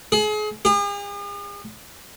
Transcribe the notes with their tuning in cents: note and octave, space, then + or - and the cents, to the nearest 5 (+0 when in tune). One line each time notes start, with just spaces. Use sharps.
G#4 +35
G#4 -45